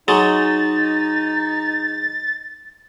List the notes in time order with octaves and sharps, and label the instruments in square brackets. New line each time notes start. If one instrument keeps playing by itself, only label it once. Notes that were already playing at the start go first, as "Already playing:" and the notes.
[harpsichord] F#3 G#3 [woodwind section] D#4 [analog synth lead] A6